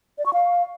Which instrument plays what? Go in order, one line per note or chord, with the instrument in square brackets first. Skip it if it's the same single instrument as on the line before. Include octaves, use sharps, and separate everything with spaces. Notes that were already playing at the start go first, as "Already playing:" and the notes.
[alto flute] D5
C#6
F5